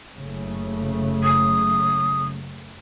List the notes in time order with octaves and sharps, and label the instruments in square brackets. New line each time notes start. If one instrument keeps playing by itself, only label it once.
[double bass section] F#1 C#3 A3
[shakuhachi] D#6